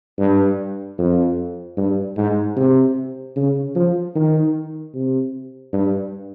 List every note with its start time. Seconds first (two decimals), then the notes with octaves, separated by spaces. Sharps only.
0.19 G2
0.99 F2
1.77 G2
2.17 G#2
2.57 C3
3.36 C#3
3.75 F3
4.15 D#3
4.94 C3
5.73 G2